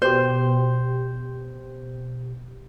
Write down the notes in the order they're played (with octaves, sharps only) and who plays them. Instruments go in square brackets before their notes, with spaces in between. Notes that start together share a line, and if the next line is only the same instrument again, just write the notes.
[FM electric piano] B2 G4 [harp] C5